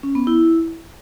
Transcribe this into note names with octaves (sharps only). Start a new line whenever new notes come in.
C#4
B3
E4